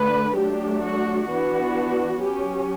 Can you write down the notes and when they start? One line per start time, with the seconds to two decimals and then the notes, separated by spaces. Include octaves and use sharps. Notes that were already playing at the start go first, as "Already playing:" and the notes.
Already playing: D3 A3 D4 B4
0.35 F#3 A3 D4 G4
0.82 F#4
1.28 E3 B3 D4 F#4
2.20 F#3 C#4 G4